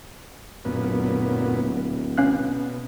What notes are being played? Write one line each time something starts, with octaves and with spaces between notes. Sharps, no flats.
D1 F#2 A#2 B3
B2 C#4 F5 F#6